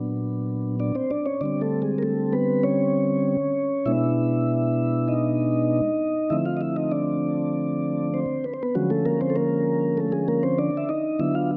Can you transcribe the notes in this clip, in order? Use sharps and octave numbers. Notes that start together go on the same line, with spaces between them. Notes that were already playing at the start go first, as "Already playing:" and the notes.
Already playing: A#2 F#3 B3 D4
D4 D5
C4 C5
D4 D5
C#4 C#5
D3 G3 C4 D4 D5
A3 A4
G#3 G#4
A#4
A3 A4
B3 B4
C#4 C#5
B2 G#3 B3 D4 E4 E5
D#4 D#5
D3 F3 A3 C4 E4 E5
F4 F5
D#5
E4 E5
D#4 D#5
D4 D5
C4 C5
B4
C5
B3 B4
D3 F3 F#3 G#3 C#4 F#4
A3 A4
A#3 A#4
C4 C5
A4
A#3 A#4
A3 A4
G#3 G#4
A#3 A#4
C4 C5
D4 D5
E5
D#4 D#5
D3 F#3 B3 D4 E4 E5
F4 F5